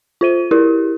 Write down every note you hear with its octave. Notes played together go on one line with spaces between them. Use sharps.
F4 C5 D#7
E4 G4 A#4